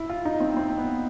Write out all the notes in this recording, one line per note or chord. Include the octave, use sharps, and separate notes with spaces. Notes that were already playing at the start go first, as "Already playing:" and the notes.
Already playing: E4
F4
D#4
C4
C4
B3